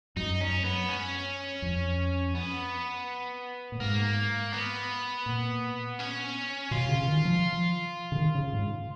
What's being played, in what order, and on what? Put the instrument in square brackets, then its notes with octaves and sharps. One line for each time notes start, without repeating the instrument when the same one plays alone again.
[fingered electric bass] F#2 [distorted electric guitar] D#4
[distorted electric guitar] C#4
B3
C#4
[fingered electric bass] F2
[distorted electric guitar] B3
[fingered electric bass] A#2
[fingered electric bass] G#2 [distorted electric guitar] A#3
[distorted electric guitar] B3
[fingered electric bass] A#2
[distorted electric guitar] C#4
[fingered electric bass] B2 [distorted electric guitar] F4
[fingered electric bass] C#3
D#3
F3
C#3
D#3
C#3
G#2